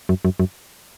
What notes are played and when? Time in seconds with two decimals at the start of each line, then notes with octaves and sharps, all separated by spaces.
0.09 F#2
0.25 F#2
0.40 F#2